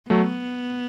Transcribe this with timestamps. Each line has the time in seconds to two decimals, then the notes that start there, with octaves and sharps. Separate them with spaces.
0.10 F#3 A3 B3